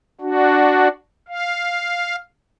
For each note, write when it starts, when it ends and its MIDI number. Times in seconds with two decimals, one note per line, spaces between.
0.21 0.88 62
0.21 0.88 66
1.28 2.16 77